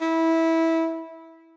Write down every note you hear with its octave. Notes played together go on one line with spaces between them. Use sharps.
E4